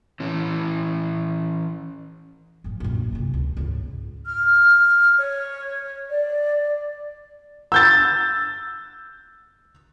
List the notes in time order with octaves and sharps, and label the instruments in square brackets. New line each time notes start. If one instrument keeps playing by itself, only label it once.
[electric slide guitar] E3 C#4
[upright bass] A2 F3
A#1 F#2
C3 E4
C#2
C#2 G#2
[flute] F6
C#5
D5
[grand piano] E6 G6 A6